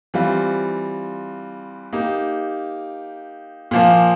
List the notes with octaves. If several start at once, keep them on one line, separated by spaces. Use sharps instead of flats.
E3 G3 C4 F4
A#3 D#4 G4
A#2 F3 A#3